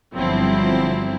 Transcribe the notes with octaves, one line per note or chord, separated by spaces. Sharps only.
G1 F3 F#3 C4 E4